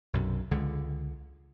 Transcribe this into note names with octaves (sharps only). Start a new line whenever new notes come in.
B1 F#2 C3
C#2 D3 G#3